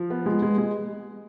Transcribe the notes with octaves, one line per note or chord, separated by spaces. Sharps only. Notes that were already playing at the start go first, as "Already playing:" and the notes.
Already playing: F3
B3
G#3
G#3
G#3